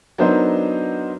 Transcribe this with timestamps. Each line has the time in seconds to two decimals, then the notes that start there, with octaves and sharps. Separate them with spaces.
0.18 F#3 B3 D4 D#4 A#4 C5